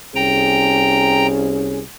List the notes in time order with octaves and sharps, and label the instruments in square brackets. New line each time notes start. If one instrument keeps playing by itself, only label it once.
[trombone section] C2 C#4 G#4 [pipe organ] G5 A#5